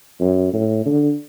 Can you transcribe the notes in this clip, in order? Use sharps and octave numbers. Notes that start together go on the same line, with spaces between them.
F#2
A2
D3